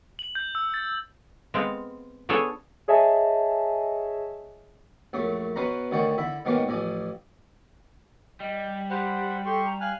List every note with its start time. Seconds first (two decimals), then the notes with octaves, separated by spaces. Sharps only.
0.19 F#7
0.35 G6
0.55 E6
0.74 A6
1.54 G#3 B3 C4 F5
2.29 B3 D4 G#4 A4 C#5 G#5
2.88 G#4 C#5 D#5 E5 G#5 A5
5.13 A#1 F#2 A3
5.56 B2 C#4 B4 C5 A#5
5.91 D2 D3 D#3 C#5 G5 C#6
6.18 D3 E4 E5
6.45 G#2 B2 A#3 C#4 G4
6.68 A1 F3 D5 G#5
8.40 G3 D#5
8.90 G4 C5 F#5 B5
9.46 G4 A4 C6 C#6
9.65 A#5
9.81 F5 G#5 F6 F#6